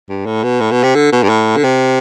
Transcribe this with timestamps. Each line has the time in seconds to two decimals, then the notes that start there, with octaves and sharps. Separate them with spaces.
0.09 G2
0.26 A2
0.43 B2
0.61 A2
0.71 B2
0.83 C3
0.95 D3
1.12 B2
1.23 G2
1.29 A2
1.57 D3
1.64 C3